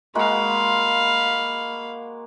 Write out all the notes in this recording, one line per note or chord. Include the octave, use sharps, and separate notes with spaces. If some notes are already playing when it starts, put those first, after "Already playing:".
G#3 A#3 F#4 F5 B5